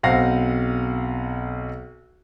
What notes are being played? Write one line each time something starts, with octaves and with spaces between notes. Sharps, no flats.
B1 C4 F5 F#5 A#6 C7